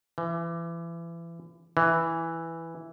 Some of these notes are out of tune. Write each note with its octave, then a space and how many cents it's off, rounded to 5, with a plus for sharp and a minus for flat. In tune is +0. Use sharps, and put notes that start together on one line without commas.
E3 +30
E3 +0